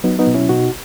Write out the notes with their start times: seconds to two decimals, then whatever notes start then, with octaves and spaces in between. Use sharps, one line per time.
0.04 F#3 B3 D#4
0.19 B3 D#4
0.27 B2
0.34 C#4 E4
0.49 B2 D#4 F#4